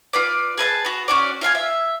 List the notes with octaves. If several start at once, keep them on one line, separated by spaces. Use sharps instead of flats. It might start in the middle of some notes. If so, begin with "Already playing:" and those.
F4 B4 D5
G#4 B4 E5 A5
B3 F#4
C#4 F#4 D5
F4 E5 F5 G#5
E5